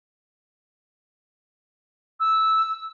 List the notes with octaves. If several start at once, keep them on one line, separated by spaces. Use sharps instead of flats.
E6